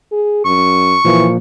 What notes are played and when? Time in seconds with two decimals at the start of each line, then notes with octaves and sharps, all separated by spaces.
0.12 G#4
0.45 F#2 C#6
1.05 A#2 E3 F3 A#3